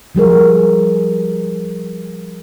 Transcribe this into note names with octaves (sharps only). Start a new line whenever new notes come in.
F3 G3 G#4 A#4